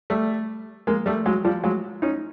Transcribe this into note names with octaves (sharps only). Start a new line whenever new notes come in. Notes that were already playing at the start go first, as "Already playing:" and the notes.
G3 A3
G#3 A#3
G3 A3
F#3 G#3
F3 G3
F#3 G#3
C#4 D#4